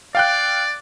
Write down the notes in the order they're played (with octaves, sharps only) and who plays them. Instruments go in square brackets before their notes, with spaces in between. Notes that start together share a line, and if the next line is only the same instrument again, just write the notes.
[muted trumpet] D5 [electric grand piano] F5 G5 F#6